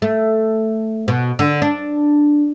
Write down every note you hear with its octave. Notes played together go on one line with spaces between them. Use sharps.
A3
B2
D3
D4